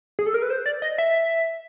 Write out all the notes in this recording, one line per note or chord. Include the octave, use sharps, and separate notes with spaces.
G#4
A4
A#4
B4
C5
D5
D#5
E5